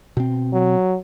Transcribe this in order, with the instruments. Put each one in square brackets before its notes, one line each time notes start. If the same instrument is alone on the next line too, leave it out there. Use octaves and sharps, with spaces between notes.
[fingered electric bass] B2 C4
[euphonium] F#3